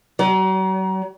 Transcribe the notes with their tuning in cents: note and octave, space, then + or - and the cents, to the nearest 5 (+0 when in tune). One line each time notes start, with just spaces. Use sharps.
F#3 +40